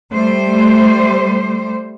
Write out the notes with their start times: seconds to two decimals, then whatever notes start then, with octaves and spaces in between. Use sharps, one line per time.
0.12 G3 A3 C5